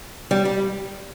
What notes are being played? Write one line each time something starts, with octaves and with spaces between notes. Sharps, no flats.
G3
G3